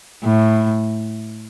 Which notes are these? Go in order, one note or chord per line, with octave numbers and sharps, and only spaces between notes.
A2